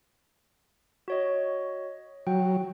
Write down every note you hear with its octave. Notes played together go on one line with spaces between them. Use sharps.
F#4 C#5 D#5
F#3 G5